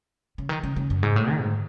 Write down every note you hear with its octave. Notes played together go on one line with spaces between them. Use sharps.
C#3
D#3
C#3
C#3
F#2
G#2
A2
D#3
G#2